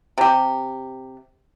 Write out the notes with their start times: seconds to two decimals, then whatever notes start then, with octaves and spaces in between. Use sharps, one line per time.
0.18 C3 G4